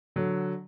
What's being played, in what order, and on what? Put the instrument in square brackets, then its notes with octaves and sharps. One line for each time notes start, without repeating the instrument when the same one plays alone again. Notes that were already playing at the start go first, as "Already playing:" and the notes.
[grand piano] D3 F#3